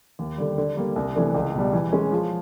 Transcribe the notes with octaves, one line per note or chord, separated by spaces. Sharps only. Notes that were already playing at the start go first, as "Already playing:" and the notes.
D#2
D3 G3
D3
G3 A#3
C2
C3 E3 A3 D4
C#2
B2 G3
E3
G#3 C#4
F3